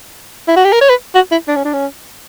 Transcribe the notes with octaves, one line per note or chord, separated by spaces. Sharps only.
E4
F#4
G4
A#4
C#5
B4
F#4
E4
D4
C#4
D4
C#4